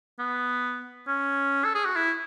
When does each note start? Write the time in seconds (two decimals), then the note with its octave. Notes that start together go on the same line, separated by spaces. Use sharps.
0.19 B3
1.08 C#4
1.65 A4
1.75 G#4
1.85 F#4
1.96 E4